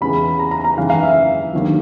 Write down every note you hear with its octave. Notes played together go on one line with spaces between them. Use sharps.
E2 C#3 E3 B5
A#5
A#5
A#5
G#1 F#2 C#3 E3 F5
F5
E5
D#2 D3 F#3